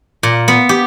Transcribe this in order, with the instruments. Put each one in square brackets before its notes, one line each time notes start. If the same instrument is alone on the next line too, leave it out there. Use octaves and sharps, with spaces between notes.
[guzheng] A#2
B3
G4